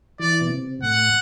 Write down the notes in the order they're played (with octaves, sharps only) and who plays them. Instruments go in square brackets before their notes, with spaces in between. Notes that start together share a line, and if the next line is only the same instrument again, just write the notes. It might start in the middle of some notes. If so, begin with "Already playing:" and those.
[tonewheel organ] E3 [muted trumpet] D5
[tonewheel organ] B2
C3
[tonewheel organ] A2 [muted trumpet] F#5